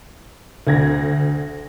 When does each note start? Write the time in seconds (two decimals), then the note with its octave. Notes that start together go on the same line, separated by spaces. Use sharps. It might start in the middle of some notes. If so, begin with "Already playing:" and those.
0.67 D2 G#6 A#6